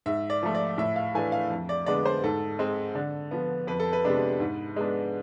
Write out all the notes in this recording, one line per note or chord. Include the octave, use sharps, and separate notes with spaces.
G#2 E5
D5
F3 A3
D5
A2 E5
F5
E3 A3 D4 G#5
F5
F2
D5
D3 G#3 B3 D5
C5
G#2 A4
G#3 C4
D3
F3 B3
F2 B4
A4
B4
C3 G#3 B3 D4
G#2
G#3 B3 D4